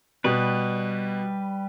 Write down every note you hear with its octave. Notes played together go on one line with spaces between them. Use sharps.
B2 G3 B4